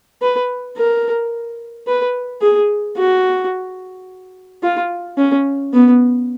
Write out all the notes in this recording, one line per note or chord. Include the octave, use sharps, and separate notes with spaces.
B4
A#4
B4
G#4
F#4
F4
C#4
B3